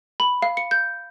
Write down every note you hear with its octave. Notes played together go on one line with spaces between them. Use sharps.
B5
F5
C#7
G6